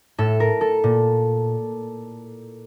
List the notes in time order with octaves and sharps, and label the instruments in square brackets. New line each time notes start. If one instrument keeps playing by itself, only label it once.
[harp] A2 A4
A#4
A4
A#2